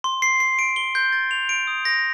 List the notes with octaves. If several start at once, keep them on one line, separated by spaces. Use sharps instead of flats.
C6
C7
C7
D7
G7
G6
A6
F7
D7
D#6
A#6